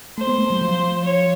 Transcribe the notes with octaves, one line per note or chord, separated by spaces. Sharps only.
A3 C5
B3
A3
F#3
F3
C#5